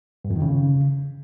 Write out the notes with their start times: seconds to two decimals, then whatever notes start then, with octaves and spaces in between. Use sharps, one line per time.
0.25 G2
0.30 F2
0.36 D#3
0.42 C#3